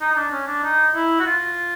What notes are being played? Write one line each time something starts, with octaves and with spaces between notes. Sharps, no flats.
D#4
D#4
D4
C#4
D4
D#4
E4
F#4
F4